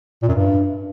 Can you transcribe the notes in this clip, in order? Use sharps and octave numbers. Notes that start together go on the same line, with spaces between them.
A#2
F#2
G2